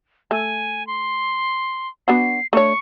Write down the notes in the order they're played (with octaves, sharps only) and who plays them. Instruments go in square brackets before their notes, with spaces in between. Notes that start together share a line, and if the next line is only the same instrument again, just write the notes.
[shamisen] A3 [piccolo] G#5
[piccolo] C6
[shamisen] B3 D4 F#4 [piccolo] C7
[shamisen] A3 D4 C#5 [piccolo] C#6